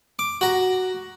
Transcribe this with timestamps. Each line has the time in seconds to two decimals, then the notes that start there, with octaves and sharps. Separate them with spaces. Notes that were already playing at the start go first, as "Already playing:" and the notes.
0.19 D6
0.41 F#4 A#5